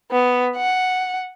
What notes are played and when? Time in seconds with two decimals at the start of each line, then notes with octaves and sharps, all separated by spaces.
0.11 B3
0.56 F#5